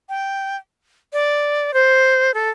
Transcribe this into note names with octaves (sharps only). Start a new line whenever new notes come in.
G5
D5
C5
A4